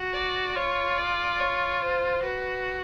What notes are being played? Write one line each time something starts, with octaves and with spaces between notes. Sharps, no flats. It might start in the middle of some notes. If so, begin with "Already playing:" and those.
Already playing: F#4
D5
F4 C#5
D5
C#5
C5
F#4 B4